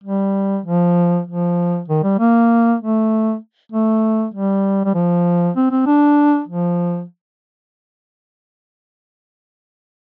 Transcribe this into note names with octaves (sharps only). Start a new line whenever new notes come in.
G3
F3
F3
D#3
G3
A#3
A3
A3
G3
G3
F3
C4
C4
D4
F3